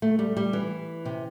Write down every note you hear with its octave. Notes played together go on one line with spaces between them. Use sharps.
A3
G3
G3
E3
C3